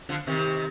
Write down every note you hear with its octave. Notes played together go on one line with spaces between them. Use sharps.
D3 F3
C3 D#3